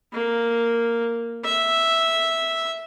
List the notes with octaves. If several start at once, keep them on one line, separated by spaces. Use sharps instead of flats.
A#3
E5